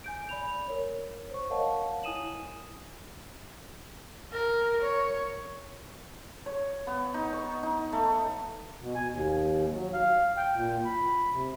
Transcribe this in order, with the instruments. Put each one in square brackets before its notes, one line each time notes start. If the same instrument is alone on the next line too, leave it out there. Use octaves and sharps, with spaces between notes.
[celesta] G#5 G6 D7
D5 B5 F7
A#4 C#5
C5 C#6
A#4 C#5 D#5 F5 F#5 A5
E4 G#5 D#6 D#7 E7 F#7
[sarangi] A#4
C#5
[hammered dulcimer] C#5
B3
D#4
C#6
D#4
A3
[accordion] B2
G#5
D#2
F#3
F5
G5
A#2
B5
C3